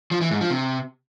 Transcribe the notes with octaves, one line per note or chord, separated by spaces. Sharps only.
F3
E3
G#2
F3
C3